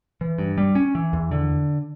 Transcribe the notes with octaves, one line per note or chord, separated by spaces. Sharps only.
E3
G2
G3
C#4
E3
E2
D3